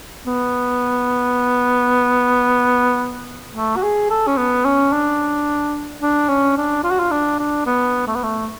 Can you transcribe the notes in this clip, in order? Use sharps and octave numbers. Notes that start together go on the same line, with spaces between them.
B3
A3
F#4
G#4
A4
C#4
B3
C#4
D4
D4
C#4
D4
F4
F#4
F4
D4
D4
B3
A3
B3
A3